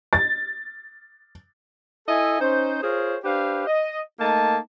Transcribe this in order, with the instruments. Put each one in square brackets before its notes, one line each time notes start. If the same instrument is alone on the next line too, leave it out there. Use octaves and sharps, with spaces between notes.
[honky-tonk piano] A6
[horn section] E4 A4 D#5 E5 G#5
C#4 D#4 C5
F4 G#4 A#4 C5 C#5
D4 G4 B4 C5 F5
D#5
A3 A#3 D#4 A5